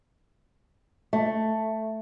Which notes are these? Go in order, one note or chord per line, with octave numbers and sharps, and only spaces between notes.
A3